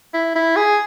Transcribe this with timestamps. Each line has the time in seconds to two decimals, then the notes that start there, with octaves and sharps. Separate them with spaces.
0.14 E4
0.36 E4
0.56 G#4